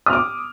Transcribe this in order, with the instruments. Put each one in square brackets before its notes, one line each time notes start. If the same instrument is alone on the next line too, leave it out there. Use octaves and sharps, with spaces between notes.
[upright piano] D#6
F6
D6